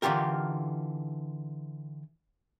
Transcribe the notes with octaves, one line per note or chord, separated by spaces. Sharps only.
D3 E3 F4 G4 A#4